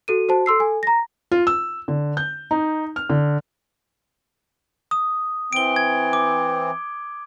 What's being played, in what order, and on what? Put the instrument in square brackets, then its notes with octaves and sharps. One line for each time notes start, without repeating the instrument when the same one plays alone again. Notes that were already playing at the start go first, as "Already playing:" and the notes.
[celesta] F#4 A4 D#7
F#4 C5 A5
A4 C6 E6 C7
A4 G#5
A#5 A#6
[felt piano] F4
E6
D3
G6
D#4
F6
D3
[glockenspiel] D#6
[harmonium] E3 C4 [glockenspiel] D7 G7
[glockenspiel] G#6
D6